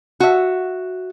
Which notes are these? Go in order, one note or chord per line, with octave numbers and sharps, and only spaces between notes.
F#4 E5